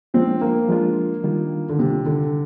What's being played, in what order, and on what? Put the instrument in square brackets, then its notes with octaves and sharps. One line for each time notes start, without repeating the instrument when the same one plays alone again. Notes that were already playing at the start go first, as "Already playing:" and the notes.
[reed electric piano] F3 G#3 D4 F4 [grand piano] C4
[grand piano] A#3
[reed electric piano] F3 G#3 D4 F4
D#3 G3 D4 F4
[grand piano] D3
[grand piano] C3 [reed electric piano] D#3 G3 D4 F4
[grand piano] D3